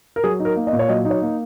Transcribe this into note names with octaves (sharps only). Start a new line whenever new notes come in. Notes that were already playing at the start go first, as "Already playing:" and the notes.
A#4
F#3 G#4
D#4
A#4
A#3
D#5
A#2
C#5
F#3 D#5
D#4
C#5
A#3